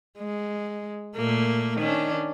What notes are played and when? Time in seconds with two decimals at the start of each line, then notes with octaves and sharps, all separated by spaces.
0.19 G#3
1.16 A#2 A3 A#3
1.78 D#3 C#4 D4